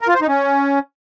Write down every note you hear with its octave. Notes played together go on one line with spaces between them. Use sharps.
A#4
F4
C5
D#4
C#4